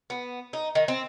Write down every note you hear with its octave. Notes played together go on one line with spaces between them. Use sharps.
B3
D#4
D#3
C4